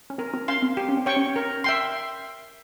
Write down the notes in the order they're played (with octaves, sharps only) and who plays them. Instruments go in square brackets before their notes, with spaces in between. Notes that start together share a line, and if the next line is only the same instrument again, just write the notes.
[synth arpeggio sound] C#4
[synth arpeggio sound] C4 [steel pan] A#4
[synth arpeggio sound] C4
[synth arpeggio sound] C#4 [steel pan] F5 C6
[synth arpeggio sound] C4
[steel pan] G4
[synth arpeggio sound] C#4
C4
[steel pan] C#5 G5 C#6
[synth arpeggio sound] C#4
[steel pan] A#4
E5 G5 C6